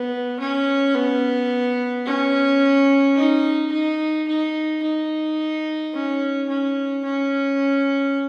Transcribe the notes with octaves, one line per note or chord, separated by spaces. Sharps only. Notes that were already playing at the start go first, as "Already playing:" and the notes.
Already playing: B3
C#4
B3
C#4
D#4
D#4
D#4
D#4
C#4
C#4
C#4